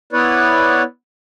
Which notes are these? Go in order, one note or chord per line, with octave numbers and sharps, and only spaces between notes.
B3 E4 B4 C#5 D5